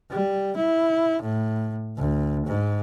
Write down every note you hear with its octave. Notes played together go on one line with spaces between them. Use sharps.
G3
E4
A2
D2
G#2